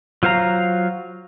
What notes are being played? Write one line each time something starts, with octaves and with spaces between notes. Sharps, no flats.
F#3 F4 C5 F5 A#5